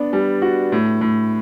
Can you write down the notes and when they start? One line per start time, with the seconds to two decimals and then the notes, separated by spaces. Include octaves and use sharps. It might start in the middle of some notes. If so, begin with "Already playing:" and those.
Already playing: B3 D4
0.13 G3
0.42 F#4
0.72 A2
1.01 A2